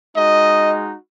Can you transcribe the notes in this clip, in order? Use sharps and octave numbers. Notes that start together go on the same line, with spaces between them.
G#3 D#4 F#4 D#5